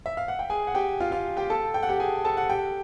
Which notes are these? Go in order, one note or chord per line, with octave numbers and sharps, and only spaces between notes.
E5
F5
F#5
G5
G#4 G#5
F#5
G4 G5
F4 F5
F4 F5
G4 G5
A4 A5
G5
F#5
G4 G5
G#4 G#5
A4 A5
F#5
G4 G5